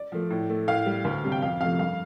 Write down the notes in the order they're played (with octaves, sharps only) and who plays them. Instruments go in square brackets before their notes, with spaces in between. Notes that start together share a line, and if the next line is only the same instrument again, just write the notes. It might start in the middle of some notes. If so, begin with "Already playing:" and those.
Already playing: [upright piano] D5
F3 A3
A2
A3
A2 F5
G3
D2
C3 G3
G5
F2 F5
C3 F3 A3 F5
G2 F5